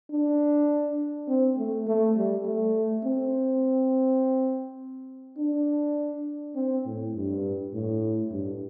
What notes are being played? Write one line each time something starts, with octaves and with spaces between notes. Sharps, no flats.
D4
C4
A3
A3
G3
A3
C4
D4
C4
A2
G2
A2
G2